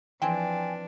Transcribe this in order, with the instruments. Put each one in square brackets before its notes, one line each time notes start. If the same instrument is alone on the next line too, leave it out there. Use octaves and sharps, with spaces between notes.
[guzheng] E3 C4 [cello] F3 D4 [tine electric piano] G5 G#5